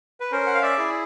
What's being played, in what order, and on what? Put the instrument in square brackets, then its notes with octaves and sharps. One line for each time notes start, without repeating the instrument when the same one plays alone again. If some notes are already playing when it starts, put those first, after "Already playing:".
[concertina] B4
C#4 A#4 C5
F#5
F5
D5 E5
E4 G#4